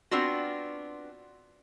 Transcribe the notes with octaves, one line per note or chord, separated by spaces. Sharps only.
B3 C4 D4 F4 F#4